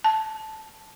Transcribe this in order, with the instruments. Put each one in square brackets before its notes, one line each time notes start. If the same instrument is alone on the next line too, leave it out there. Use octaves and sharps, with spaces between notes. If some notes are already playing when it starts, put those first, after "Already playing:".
[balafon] A5